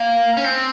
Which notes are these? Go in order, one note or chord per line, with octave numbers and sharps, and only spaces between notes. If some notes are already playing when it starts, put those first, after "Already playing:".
Already playing: A#3
C#4
C4